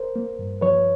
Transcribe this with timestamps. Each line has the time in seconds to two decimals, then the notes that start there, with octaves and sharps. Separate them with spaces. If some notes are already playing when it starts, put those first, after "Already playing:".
Already playing: A#4 C5
0.16 A#3
0.39 G2
0.61 F3 B4 C#5